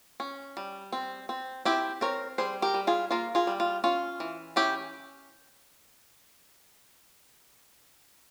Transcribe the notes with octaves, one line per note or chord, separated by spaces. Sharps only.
C#4
G3
C4
C4
C4 E4 G4
C4 A#4 C#5
G3 G#4 C5
G4 A#4
G3
F4 G#4
A#3 F4
F4 G#4
G3
F4
C#4 F4
E3
C#4 E4 G4